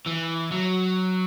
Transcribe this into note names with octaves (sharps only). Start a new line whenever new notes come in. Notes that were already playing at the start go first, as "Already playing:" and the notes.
E3
F#3